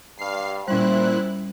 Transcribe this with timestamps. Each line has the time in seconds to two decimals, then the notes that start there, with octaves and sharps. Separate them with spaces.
0.18 G2 F5 C7
0.68 A#2 G3 C#4 E4 C5 F#6